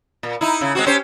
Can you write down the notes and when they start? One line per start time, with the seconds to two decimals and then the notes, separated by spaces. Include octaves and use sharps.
0.23 A#2
0.41 D#4 E4
0.61 C#3 E4
0.75 G#3 C4 F#4
0.86 C#4 G4 C5